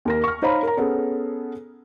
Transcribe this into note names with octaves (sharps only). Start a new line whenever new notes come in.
D#2 A#4 A#6
C#6 F6
D#4 C5 C#5 F5 A#5 B5
A#4 A#5
B3 C#4 G#4 A4